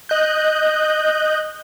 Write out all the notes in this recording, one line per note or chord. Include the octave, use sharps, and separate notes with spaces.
D#5 F#6 G6